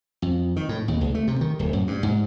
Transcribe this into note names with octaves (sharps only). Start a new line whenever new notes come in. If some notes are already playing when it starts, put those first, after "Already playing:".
F2
D#3
A2
D#2
C#2
A3
C3
D#3
D1
F#2
G2
G#2